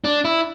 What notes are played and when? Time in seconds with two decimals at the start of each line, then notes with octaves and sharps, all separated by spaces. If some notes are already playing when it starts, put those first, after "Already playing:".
0.04 D4
0.25 E4